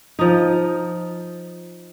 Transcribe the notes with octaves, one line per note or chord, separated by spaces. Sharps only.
F3 D#4